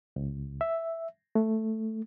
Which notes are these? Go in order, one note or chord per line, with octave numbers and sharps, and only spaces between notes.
C#2
E5
A3